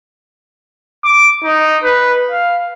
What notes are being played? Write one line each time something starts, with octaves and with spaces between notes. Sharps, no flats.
D6
D#4
B4
F5